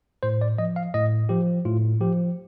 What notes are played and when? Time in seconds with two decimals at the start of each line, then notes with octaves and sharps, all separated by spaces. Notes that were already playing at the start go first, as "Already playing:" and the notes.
0.23 A2 C5
0.41 D5
0.58 F3 D#5
0.76 F5
0.94 A2 D#5
1.29 F3 G4
1.65 A2 F4
2.01 F3 G4